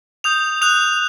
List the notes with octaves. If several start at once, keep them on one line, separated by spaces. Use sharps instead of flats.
D#6 G6 F7
D#6 F#6 F7